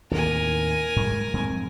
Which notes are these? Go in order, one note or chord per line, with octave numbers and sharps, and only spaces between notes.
D#2 A2 C3 A#4 G#5
G#2 G3 G#3
F2 G#2 C4